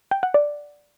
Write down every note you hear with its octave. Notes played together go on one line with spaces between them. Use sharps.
G5
F#5
D5